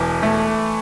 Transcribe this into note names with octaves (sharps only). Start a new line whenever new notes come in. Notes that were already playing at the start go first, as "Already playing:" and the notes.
Already playing: E1 E3
A3